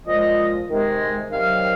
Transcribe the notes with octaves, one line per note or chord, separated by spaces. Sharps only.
A#2 F3 G#3 D#5
C3 D#3 G#3
C3 D#3 F#3 F5